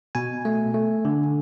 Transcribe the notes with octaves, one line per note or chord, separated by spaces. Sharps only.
B2 G#5
A3
A3
D3